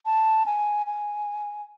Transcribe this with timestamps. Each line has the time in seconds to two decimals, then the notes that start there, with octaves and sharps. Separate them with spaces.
0.06 A5
0.46 G#5
0.86 G#5